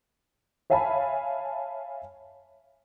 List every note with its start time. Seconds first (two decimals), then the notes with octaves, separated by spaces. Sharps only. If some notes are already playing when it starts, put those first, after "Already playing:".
0.70 C#5 E5 F5 G#5 A5 B5